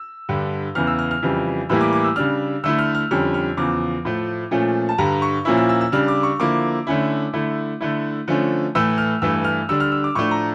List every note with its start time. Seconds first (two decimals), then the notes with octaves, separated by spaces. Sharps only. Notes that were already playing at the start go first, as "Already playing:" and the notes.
Already playing: E6
0.29 G2 D3 G3
0.75 E2 C#3 E3 F6
0.87 E6
0.99 F6
1.11 F6
1.22 F2 C#3 E3 G3
1.69 A2 E3 G3 A#3 E4 E6
1.81 D6
1.93 D6
2.04 E6
2.16 C#3 G3 D4 F6
2.64 D3 A3 E4 E6
2.79 F6
2.95 F6
3.11 F2 D3 G3 C#4 F6
3.34 F6
3.57 E2 C#3 F3 D6
4.05 A2 F3 A3
4.51 A#2 F3 A3 C#4
4.89 A5
4.98 G2 D3 G3 A#5
5.22 C#6
5.45 A#2 F3 A#3 C#4 E4 E6
5.57 E6
5.69 E6
5.81 E6
5.92 C#3 G3 D4 F6
6.08 D6
6.23 C#6
6.39 D3 F3 A#3 E4 D6
6.87 D3 A3 C#4 E4
7.33 D3 A3 E4
7.81 D3 A3 E4
8.28 D3 F3 A3 C#4
8.75 A2 E3 A3 E6
8.98 F6
9.22 G2 E3 A3 E6
9.44 F6
9.69 D3 G3 D4 E6
9.80 F6
9.92 E6
10.04 D6
10.15 A2 F3 A3 D4 C#6
10.31 A#5